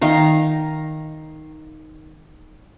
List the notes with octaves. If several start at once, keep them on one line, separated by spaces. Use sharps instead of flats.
D#3 F5 A#5